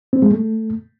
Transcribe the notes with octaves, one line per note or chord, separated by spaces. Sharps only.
C4
G#3
A3